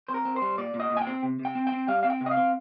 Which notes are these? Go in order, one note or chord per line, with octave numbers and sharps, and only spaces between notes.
C4 C5
A#4
C4
C5
G3
A#2 D5
A#2
D#5
A#2
G#5
G5
C4
C3
C3
G5
C4
G5
C4
G3 F5
C4 F5
G5
C3
D#5
F5
C4